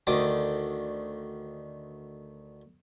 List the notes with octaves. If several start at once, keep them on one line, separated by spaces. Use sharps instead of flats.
D2 D3 D#3 D6 D#6